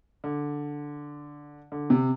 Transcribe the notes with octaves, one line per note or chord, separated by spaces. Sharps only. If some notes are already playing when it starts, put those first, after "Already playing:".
D3
D3
C3